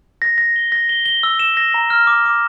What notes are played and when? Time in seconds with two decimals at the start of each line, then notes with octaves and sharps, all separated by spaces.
0.22 A#6
0.38 A#6
0.56 G7
0.72 A#6
0.89 G7
1.06 G7
1.23 E6
1.39 E7
1.57 A#6
1.74 A#5
1.90 F6
2.07 D6
2.25 D6